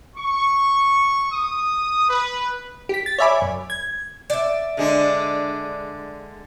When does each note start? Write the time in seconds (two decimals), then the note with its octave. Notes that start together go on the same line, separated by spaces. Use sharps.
0.17 C#6
1.30 D#6
2.09 B4
2.89 G4 B6
3.06 A6
3.18 C#5 D5 E5 G#5 B5 D6
3.42 F#2
3.70 G#6
4.30 D5 E5
4.77 D3 G#3 D4